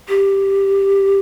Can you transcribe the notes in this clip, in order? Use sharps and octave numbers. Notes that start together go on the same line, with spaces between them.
G4